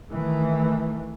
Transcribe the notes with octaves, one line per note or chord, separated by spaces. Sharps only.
D#3 E3 A3